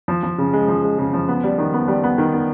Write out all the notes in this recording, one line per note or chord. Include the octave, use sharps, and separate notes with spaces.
F3
F3
C#3
G#3
F3
G#3
C#3
F3
B3
G3
D#3
B3
G3
B3
D#3
B3